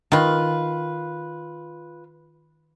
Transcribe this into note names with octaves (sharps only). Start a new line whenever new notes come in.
D#3 F4 B4